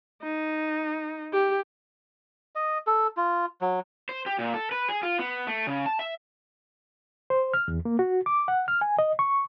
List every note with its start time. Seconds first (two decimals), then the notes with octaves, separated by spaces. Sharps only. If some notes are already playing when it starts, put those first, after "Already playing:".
0.23 D#4
1.33 G4
2.55 D#5
2.87 A4
3.17 F4
3.61 F#3
4.09 C5
4.26 G4
4.39 A#2
4.54 A4
4.72 B4
4.89 G#4
5.03 F4
5.19 B3
5.47 A3
5.67 C#3
5.86 A5
5.99 E5
7.30 C5
7.54 F6
7.68 E2
7.85 A#3
7.99 F#4
8.26 D6
8.48 F#5
8.68 F6
8.81 G#5
8.99 D#5
9.19 C#6